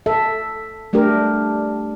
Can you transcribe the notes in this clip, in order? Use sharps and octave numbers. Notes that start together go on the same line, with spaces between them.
A4 E5
G3 A3 D4 G4 A#4